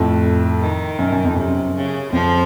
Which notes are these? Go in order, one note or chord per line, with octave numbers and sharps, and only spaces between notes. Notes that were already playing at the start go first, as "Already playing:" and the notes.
Already playing: F2 A2
D#3
F#2
F#2
F2
F#2 C3
C#3
F2 F3